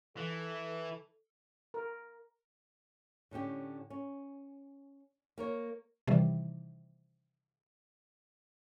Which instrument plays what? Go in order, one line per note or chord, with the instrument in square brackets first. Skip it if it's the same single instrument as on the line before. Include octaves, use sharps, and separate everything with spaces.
[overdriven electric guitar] E3 [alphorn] A4
[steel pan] A#4
[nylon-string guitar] A2 D3 C#4 G4
C#4
A#3 A#4 C#5
[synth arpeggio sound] C3 D#3 E3 G3